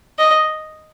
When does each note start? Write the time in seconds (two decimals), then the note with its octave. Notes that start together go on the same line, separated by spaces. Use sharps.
0.19 D#5